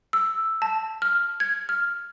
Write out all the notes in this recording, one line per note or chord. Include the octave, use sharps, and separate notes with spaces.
E6
A5
F6
G#6
F6